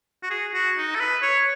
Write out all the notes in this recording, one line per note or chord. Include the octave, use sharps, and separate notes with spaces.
F#4
G#4
F#4
D#4
A4
B4
C#5